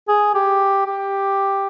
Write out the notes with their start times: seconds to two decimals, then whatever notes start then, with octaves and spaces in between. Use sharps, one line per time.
0.08 G#4
0.35 G4
0.86 G4